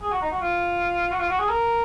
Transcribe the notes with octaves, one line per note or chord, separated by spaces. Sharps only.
G#4
F#4
D#4
F#4
F4
F#4
F4
F#4
G#4
A#4